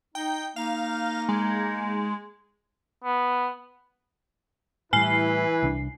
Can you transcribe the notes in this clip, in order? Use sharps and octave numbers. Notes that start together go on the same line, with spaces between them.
D#4 G5
A#3 D#4 F5
G#3
B3
A2 E3 G3 E4 B4 G#5 C7
C2 D4